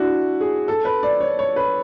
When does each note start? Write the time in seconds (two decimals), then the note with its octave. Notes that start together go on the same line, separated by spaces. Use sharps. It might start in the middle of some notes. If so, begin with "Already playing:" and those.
Already playing: D4 E4 F#4
0.41 G#4
0.68 A4
0.85 B4
1.03 D5
1.20 C#5
1.39 C#5
1.56 B4